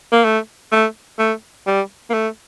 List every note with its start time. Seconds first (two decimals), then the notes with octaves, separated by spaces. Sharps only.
0.12 A#3
0.24 A3
0.72 A3
1.18 A3
1.67 G3
2.10 A#3
2.14 A3